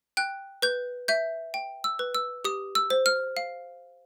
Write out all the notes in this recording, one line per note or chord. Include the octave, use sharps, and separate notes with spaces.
G5 F#6
B4 G6
E5 G6
G5
E6
B4
E6
G4 D#6
E6
C5
F6
F5